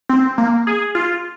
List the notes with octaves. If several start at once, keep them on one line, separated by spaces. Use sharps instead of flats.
C4
A#3
G#4
F4